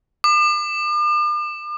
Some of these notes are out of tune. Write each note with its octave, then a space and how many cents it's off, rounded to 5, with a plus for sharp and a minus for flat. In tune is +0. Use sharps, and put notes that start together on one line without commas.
D6 +40